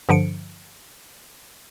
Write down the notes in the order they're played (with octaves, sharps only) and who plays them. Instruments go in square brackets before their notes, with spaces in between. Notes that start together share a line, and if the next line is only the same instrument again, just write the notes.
[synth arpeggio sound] G2 D3 F3 C#7 D7